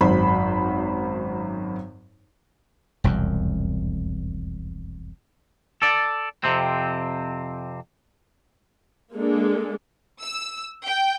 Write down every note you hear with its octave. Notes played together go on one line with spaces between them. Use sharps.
G#1 F#2 C5 B5
E1 C2 F2
A4 D5
F2 C3 C4
G#3 A#3 D4 A4
E6
G5